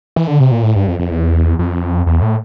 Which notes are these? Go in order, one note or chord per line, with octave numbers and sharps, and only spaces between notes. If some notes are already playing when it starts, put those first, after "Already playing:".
E3
D3
C3
A#2
A2
G2
F2
F2
E2
F2
E2
A2